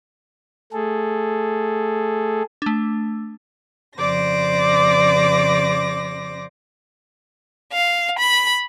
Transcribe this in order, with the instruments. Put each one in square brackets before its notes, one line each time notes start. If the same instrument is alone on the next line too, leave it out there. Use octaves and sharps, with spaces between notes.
[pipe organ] A3 G#4 A4
[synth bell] A3 D4
[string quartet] F2 C#3 C5 D5 D6 A#6
F5
B5